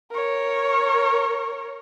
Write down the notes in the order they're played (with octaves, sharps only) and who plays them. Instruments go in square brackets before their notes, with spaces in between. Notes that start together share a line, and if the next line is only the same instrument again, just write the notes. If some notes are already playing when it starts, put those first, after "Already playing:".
[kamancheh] A#4 C#5